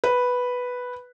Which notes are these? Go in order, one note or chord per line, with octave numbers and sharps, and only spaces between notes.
B4